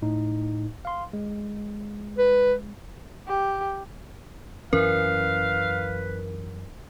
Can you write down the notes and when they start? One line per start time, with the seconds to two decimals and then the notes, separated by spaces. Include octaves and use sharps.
0.02 A2 D#4
0.85 F5 C6
1.13 G#3
2.18 B4
3.27 G4
4.73 F#2 E3 C#4 A#4 B4 F5